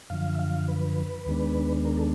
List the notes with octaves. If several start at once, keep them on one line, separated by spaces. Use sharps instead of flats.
F#2 D3 F3 F5
E5
F5
B4
D#2 D#3 G#3 B3 D4
A#4
A4